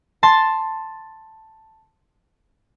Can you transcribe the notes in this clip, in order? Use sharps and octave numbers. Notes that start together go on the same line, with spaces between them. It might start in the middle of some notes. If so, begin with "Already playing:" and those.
A5 C6 A6